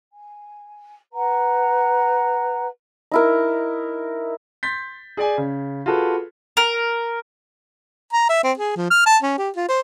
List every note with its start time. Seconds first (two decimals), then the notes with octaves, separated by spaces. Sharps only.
0.11 G#5
1.12 B4 F#5 A#5
3.12 D#4 E4 A#4
4.63 C6 G6 A6 B6
5.17 G#4 D5 G#5
5.37 C#3
5.86 F4 F#4 G#4 A4 B4
6.57 A#4
8.13 A#5
8.29 E5
8.44 C4
8.57 G#4
8.76 F3
8.90 F6
9.06 A5
9.22 C#4
9.38 G4
9.56 F4
9.68 C5